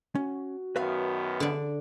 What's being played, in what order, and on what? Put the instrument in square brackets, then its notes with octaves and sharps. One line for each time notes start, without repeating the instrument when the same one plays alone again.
[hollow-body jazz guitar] C#4 [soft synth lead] F#4
[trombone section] F#2 D#3 B3 [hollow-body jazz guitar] B4 E5 F5
[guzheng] D3 D4